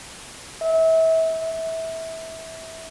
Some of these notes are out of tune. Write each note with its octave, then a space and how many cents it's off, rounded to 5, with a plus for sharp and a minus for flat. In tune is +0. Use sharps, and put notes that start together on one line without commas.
E5 -30
E5 -20